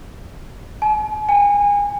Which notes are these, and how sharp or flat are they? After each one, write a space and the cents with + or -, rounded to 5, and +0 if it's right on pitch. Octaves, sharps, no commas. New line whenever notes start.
G#5 +45
G#5 -30